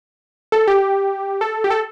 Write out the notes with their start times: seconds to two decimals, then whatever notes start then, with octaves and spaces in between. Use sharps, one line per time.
0.52 A4
0.68 G4
1.41 A4
1.64 G4
1.70 A4